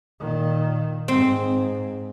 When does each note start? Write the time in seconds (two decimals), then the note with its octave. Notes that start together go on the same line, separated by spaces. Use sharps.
0.20 A#2 D#3
1.08 G#2 C4